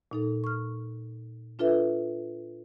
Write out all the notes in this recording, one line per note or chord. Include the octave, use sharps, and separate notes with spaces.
A#2 D#4 A4
C#6 F6
D4 F4 A4 B4 E5